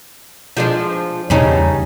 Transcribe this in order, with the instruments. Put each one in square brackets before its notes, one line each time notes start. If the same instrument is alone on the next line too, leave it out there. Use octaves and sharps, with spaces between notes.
[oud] F3 G#3 D4
[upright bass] E2 [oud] G2 C#3 D#4